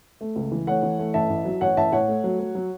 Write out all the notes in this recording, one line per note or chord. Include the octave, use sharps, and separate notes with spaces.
A3
C#2
E3
A3 C#5 F#5
E3
A3
A1 E5 A5
A1
F#3
A1 C#5 F#5
A1 E5 A5
A2 C#5 F#5
A3
F#3
F#3
F#3